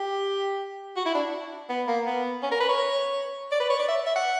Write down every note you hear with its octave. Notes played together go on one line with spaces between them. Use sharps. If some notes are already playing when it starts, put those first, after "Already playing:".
Already playing: G4
F#4
E4
D4
B3
A#3
B3
C#4
A#4
B4
C#5
D5
B4
C#5
D5
E5
E5
F#5